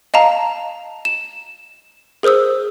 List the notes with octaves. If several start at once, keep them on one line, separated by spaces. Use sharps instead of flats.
D#5 F5 A5 A#5
E7
G#4 A#4 C5 D#6 E6